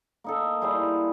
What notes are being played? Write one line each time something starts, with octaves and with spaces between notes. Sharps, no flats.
A#3 D#4 A4
G3 E4 G#4 C5